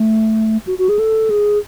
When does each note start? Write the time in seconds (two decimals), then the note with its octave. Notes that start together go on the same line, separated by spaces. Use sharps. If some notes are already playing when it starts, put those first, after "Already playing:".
Already playing: A3
0.67 F#4
0.79 F#4
0.89 G#4
0.99 A4
1.30 G#4